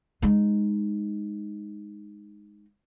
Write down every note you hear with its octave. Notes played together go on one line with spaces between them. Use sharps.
G#3 D#4